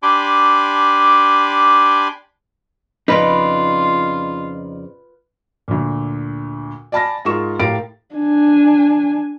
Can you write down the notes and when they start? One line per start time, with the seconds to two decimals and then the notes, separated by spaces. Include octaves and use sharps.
0.03 D4 G4 G#5 B5 C6 D6
3.08 F2 C#3 D#4 F4 B4 D5
5.68 D2 A#2
6.92 D5 G#5 A5 B5 A6 A#6
7.25 G#2 G#3 F4 A#4 C#6 E7
7.60 A2 G4 A#4 F5 A6 D7
8.15 D4 G#5